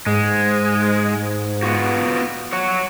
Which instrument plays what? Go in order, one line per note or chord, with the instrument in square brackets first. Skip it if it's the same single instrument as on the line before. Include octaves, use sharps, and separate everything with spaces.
[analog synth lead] G#2 [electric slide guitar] G#3
[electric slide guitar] B3 F4 F#4
C#5 F#5